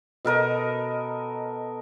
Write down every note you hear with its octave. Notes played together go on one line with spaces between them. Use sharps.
B2 A4 A#4 D#5